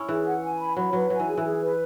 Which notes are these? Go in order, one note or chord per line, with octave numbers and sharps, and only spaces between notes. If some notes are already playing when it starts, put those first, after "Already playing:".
Already playing: C#4 E4
E3 G#4
F#5
G#5
B5
F#3 B5
F#3 B4
F#3 G#5
E3
G#4
E3
G#4
B4